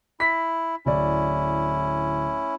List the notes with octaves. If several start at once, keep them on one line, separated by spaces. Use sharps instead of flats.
E4 B6
D1 C#4 E4 D5